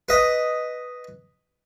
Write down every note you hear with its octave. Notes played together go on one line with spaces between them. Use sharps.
B4 D#5